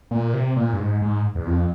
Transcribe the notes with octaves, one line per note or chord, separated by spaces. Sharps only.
A#2
C3
A#2
G2
G#2
G#2
E2
F2